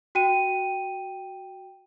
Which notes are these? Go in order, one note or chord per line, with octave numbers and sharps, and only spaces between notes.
F#4 G5 D#7